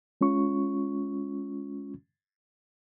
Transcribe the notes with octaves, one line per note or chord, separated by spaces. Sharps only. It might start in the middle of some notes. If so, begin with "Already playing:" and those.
G#3 C#4 F4 C#6